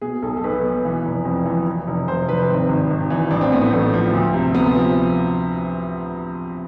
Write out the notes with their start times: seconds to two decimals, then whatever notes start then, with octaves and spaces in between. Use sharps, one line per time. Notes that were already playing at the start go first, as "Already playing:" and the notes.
0.01 B2 G#4
0.23 B1 A4
0.37 A4
0.44 B1 B4
0.64 B2
0.85 E3
1.05 F1
1.25 F2
1.45 E3
1.67 E3
1.88 F1
2.08 F1 C5
2.28 F1 B4
2.48 G#1 C4
2.69 G#1
2.91 G#1
3.10 E3
3.31 A1 D4
3.41 C4
3.52 A2 B3
3.61 A3
3.72 A1 B3
3.94 F3
4.13 D2
4.34 C3
4.55 C3 B3
4.75 F3